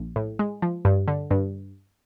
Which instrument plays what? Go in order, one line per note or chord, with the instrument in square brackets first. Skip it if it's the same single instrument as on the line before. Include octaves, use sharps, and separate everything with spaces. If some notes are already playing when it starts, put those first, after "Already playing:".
Already playing: [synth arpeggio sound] A#1
A2
G#3
F3
G2
D3
G2